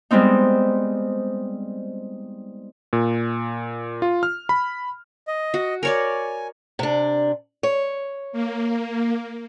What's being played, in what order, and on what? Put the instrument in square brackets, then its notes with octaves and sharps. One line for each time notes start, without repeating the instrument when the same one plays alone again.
[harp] G3 G#3 B3 C4 D#4
[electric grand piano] A#2
F4
F6
B5
[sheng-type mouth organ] D#5
[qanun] F#4
[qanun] A#4 C#5 D5 [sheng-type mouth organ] G#5
[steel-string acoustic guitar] C3 D4
C#5
[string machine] A#3